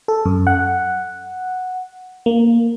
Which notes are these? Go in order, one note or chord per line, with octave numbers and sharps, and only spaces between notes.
A4
F#2
F#5
A#3